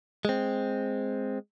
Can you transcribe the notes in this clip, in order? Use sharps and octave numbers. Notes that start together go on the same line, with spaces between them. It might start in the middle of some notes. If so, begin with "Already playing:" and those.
G#3 C4